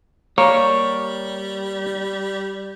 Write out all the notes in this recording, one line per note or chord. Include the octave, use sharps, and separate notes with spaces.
G3 A#3 A#4 C#5